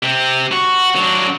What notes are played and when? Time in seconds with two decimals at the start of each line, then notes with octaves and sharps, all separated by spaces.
0.03 C3 C4
0.52 F#4
0.96 F#3 D4